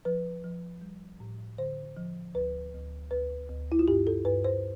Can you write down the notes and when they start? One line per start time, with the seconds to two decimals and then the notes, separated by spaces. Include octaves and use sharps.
0.05 F3 B4
0.44 F3
0.81 G3
1.20 A2
1.58 D3 C5
1.97 F3
2.34 D2 B4
2.73 D2
3.10 D2 B4
3.49 D2
3.72 E4
3.79 F4
3.88 G2 G4
4.07 A4
4.25 G2 B4
4.44 C5